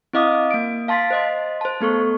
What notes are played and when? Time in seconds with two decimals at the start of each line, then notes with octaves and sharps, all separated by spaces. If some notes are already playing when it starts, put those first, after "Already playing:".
0.13 C4 E4 D#5 F5 D6 D#6
0.51 A#3 D7
0.88 F5 A5 C6 A6 B6
1.11 C5 D#5 C6
1.61 C5 A5
1.80 A3 B3 A4 C#6